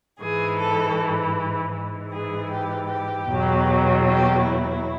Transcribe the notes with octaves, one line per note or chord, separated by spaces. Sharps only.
G#2 E3 G#4
A4
G#2 E3
G#4
G4
G4
E2 B2 F#3
G4
E4